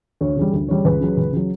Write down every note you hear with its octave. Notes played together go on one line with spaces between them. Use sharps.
D2 C#5
C#3 G3
D2
C#3 G3 C#5
C#2 B4
C#3 F#3
C#2
C#3 F#3